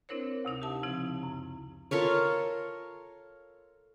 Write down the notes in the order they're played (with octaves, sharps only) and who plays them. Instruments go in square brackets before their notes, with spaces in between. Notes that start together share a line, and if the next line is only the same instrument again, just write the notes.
[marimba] C4 D4 E4 A#4 C5 C#5
D2 C3 D#4 E4
G4 E5 A5
C#3 F3 C4 E4
F#2
[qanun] F4 A4 A#4 C#5